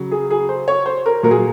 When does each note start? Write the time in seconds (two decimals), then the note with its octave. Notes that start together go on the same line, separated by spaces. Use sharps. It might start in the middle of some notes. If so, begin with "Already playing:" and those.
Already playing: C#3 F#3
0.11 G#4
0.31 G#4
0.49 C5
0.68 C#5
0.86 C5
1.06 A#4
1.23 A#2 F#3 A#4
1.31 G#4